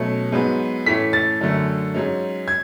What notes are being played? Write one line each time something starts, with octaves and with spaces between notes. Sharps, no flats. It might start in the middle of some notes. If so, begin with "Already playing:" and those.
Already playing: B2 F#3 A3 C#4
G#2 F#3 B3
A2 E3 A3 C#4 B6
A6
F#2 D3 A3
G#2 F#3 C#4
G#6